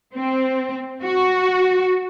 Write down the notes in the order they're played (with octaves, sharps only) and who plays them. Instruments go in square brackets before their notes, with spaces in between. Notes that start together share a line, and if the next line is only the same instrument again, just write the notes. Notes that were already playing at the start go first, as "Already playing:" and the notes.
[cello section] C4
F#4